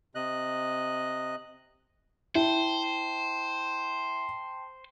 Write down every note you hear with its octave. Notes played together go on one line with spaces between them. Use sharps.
C3 D#5 F#6
E4 C5 G5 A5